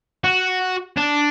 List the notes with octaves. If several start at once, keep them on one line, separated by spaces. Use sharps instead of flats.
F#4
D4